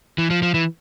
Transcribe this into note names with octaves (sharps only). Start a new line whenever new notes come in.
E3
F3
F3
E3